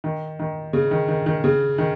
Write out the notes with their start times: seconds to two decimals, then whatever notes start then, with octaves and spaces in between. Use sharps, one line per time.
0.04 D#3
0.39 D#3
0.73 C#3
0.91 D#3
1.08 D#3
1.26 D#3
1.44 C#3
1.78 D#3